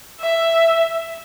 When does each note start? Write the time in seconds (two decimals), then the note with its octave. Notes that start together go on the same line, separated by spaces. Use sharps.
0.21 E5